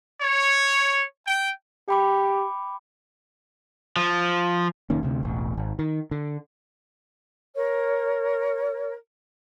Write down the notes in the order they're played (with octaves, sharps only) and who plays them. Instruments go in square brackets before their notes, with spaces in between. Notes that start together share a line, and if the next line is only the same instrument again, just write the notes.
[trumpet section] C#5
G5
[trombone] G4 [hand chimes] G5 B5 D6
[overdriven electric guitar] F3
[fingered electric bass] F1 D#3 A#3 C#4
D2 C3
E1 A1
G#1
D#3
D3
[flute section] A#4 C#5